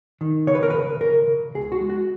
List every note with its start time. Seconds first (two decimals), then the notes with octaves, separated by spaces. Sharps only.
0.21 D#3
0.47 C#3 C#5
0.55 B4
0.63 A#4
0.70 C#3 B4
1.01 C#3 A#4
1.27 C#3
1.55 C#2 G#4
1.72 F#4
1.81 G#3
1.90 F#4